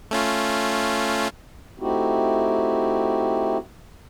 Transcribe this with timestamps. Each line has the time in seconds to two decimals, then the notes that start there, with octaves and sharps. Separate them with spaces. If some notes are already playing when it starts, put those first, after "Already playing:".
0.11 A3 C#4 F4
1.80 A3 C4 D#4 E4 F#4 G4